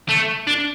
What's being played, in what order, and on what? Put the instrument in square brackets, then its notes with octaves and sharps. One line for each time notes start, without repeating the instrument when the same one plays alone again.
[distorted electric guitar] A3
D4